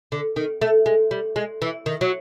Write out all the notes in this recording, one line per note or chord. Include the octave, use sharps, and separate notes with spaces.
D3
D#3
A3
G#3
G3
G#3
E3
D#3
F#3